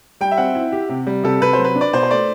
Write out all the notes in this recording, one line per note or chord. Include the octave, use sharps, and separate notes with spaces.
G3 G5
E5
C4 F#5
E4
G4
C3
G3
C3 A4
C3 B4
C5
F#3
B4
D4
D5
B2 C5
C5
A3 D5